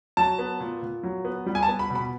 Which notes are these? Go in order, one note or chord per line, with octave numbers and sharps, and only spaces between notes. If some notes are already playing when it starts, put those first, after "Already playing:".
F#3 A5
B3
A#2
A#2
F#3
B3
G3
G#5
A5
B3
B5
B2
B5